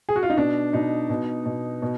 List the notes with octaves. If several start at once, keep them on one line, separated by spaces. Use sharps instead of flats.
G#4
F#4
F4
D#4
B2 D4
B2 D#4
B2
B2
B2